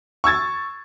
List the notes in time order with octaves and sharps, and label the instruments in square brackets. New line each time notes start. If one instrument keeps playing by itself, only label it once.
[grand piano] C#6 E6 G#6 A6